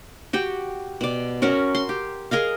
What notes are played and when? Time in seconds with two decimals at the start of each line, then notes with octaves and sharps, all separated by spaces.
0.33 F#4 G4 G5
1.01 B2 D5
1.42 C#4 F#4 A#4 C#5
1.75 C6
1.89 G4
2.31 G#4 A#4 D#5 F5